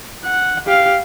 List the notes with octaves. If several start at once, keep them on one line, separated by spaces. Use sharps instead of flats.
F#5
G4 F5